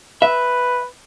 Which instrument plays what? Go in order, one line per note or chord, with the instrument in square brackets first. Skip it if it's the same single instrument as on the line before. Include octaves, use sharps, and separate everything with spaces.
[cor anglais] B4 [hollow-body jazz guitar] E5